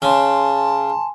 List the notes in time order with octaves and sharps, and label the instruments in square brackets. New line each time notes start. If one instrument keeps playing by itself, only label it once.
[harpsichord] C#3 [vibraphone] G#5 C6 [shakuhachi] A5